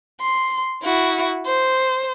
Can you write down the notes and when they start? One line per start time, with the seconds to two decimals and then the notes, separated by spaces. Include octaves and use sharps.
0.21 C6
0.83 E4 F#4
1.46 C5